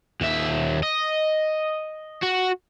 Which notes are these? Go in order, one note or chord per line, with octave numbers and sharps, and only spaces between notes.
D#2 E5
D#5
F#4